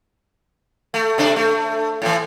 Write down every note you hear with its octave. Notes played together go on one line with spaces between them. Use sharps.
A3
C3 D4
A3
A2 E3